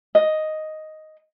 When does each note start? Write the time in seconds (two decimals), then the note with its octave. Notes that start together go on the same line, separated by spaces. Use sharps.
0.15 D#5